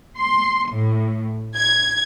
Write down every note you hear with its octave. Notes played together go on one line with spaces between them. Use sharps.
C6
A2
G#6